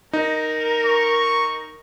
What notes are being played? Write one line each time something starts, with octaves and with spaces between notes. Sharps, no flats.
D#4 A#4
C#6